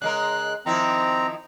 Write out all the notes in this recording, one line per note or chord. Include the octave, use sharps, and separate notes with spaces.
C#3 G#3 A#4 F#6
D#3 F3 C4 E4 A#5